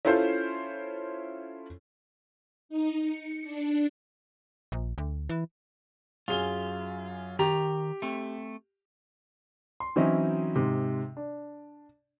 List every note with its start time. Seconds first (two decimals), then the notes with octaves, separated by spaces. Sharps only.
0.05 C#4 E4 F4 A4 C5
2.69 D#4
3.04 C#7
3.43 D4
4.72 A#1
4.98 D2
5.29 E3
6.28 F#2 F4 G#4 G7
7.39 D#3 G4 A#5
8.02 A3 C4
9.80 C6
9.96 E3 F#3 C4 C#4 D#4 E4
10.56 G#2 C3
11.17 D4